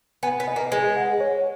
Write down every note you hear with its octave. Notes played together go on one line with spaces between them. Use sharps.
B3 G#5
B3
D#5
A#3
G#3 B4
F#5
C#5